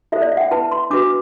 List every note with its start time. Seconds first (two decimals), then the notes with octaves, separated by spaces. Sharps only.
0.12 E4 A4 C5 E5
0.22 D5
0.32 E5
0.37 F#5
0.41 G5
0.51 E4 B4 A5
0.72 C6
0.90 D4 F#4 B4 D6
1.02 D6